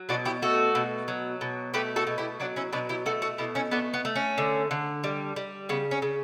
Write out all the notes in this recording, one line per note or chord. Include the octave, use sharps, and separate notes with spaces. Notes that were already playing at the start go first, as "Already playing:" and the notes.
Already playing: F#3
B2 D4 F#4
E4 G4
A3 F#4 A4
B2
F#3
B2
A3 G4 B4
F#4 A4
B2
E4 G4
F#3 D4 F#4
C#4 E4
B2 B3 D4
E4 G4
A3 F#4 A4
F#4 A4
B2 E4 G4
C#4 E4
A3 B3 D4
B3
A3
C#4
D3
D3
G3
G3
C#3 B3
C#4
C#3